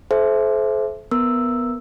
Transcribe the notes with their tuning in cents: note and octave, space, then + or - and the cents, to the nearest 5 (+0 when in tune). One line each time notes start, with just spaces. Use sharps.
A4 -40 C5 +0 E5 +10
B3 +0 A#4 +0 E6 +0